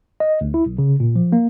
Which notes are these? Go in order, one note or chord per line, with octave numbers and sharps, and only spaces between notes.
D#5
D2
E4
B1
C#3
A#2
F3
A#3